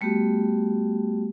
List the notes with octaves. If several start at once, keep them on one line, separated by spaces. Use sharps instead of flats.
G3 A3 B3 F#4 G4